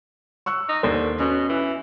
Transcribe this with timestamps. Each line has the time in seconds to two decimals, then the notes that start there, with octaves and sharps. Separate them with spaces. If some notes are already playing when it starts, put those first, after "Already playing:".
0.46 C#6 E6 F#6
0.69 D#4
0.83 D#2 D3 C5
1.20 B2 C#4
1.49 E3